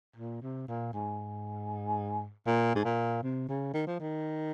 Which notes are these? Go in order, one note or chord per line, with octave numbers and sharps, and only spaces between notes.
A#2
C3
A#2
G#2
A#2
G#2
A#2
C3
C#3
D#3
F3
D#3